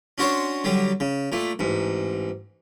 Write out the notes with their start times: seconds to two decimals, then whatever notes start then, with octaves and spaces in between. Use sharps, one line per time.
0.18 C#4 D4 F#4 C5 C#5
0.64 D3 F#3 G3
1.00 C#3
1.32 A#2 A3
1.59 A1 G#2